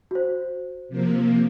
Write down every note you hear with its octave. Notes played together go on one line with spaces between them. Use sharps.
F#4 C5
C3 F3 A#3